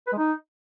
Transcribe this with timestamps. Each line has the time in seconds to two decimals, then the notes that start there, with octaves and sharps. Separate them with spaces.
0.07 B4
0.12 G#3
0.18 D#4